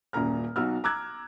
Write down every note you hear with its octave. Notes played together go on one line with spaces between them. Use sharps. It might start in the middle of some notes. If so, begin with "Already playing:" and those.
D#1 F#2 A#2 A#5 F6
B1 F#3 D#4 F#4 E6 F6
A#5 D6 E6 F#6 G#6